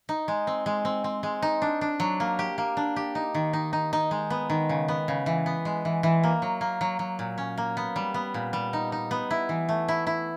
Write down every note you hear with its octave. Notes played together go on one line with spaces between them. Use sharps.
D#4
G#3
C4
G#3
C4
C4
G#3
D#4
D4
D4
F#3
A#3
G4
A#3
D4
G4
D#4
D#3
D#4
D#4
D#4
G#3
B3
D#3
C#3
B3
C#3
E3
B3
G#3
E3
E3
A#3
F#3
A#3
F#3
F#3
A#2
C#4
A#3
B3
G3
B3
A#2
G3
D#4
D#4
B3
E4
E3
A3
E4
E4